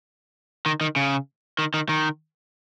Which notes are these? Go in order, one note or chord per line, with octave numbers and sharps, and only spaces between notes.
D#3
D#3
C#3
D#3
D#3
D#3